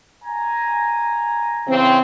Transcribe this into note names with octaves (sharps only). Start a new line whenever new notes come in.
G#5 A#5
C#3 E3 C4